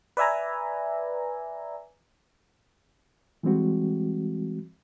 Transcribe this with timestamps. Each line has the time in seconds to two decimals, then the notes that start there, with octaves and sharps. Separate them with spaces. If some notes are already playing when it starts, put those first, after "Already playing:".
0.17 B4 D5 E5 G#5 A#5
3.43 E3 G3 G#3 C4 F#4